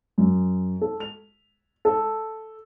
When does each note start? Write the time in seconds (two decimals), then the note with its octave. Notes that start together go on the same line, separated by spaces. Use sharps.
0.18 F#2
0.81 A4
1.00 F7
1.85 A4